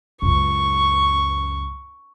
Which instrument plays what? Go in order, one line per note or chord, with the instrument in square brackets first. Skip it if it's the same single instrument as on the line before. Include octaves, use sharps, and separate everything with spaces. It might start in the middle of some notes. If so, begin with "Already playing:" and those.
[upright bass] C#2 F#2 [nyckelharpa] C#6